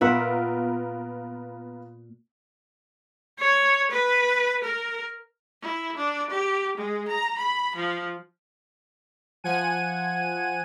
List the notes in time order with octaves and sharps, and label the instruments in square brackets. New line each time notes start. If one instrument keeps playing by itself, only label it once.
[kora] A#2 E5 F#5 [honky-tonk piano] B3 F4 A#4
[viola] C#5
B4
A#4
E4
D4
G4
G#3
A#5
B5
F3
[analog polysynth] F3 F#5 G#5 D#7